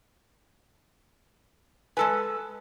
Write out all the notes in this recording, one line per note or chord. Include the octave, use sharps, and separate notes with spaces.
G#3 A4 B4 G#5 A5